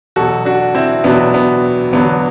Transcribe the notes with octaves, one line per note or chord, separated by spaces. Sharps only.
E2 B2 F#3 F#4 A4
D4 F#4
C4 E4
E2 B2 F#3 B3 D4
B3
E2 D3 F#3 B3